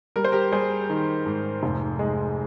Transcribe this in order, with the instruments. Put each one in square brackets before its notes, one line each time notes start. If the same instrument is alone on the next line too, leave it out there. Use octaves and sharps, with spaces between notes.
[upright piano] G3 A#4
C5
G4 A#4
G3 G#4 C5
D#3
G#2
F1
G#3